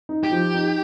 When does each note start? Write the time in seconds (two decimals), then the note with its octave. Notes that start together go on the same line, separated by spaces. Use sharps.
0.09 D#4
0.24 G4
0.32 F3
0.54 D#4